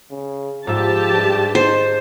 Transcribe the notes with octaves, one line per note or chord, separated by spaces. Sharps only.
C#3
G#2 F3 G4 E5 A5
G2
D#4 C5